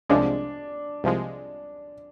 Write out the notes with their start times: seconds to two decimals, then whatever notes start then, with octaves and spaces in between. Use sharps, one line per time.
0.09 C2 C3 F3 G#3 D4
1.04 C2 C3 F3 G#3